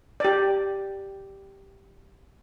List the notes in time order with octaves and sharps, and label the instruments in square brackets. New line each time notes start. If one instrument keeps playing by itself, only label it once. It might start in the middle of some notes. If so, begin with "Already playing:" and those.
[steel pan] G4 D5